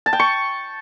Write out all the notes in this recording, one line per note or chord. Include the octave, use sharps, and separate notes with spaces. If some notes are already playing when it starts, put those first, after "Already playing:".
A5
G5
C#6